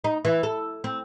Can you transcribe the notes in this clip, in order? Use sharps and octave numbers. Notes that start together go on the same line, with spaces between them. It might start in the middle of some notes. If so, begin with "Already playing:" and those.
D#4
E3
A4
C4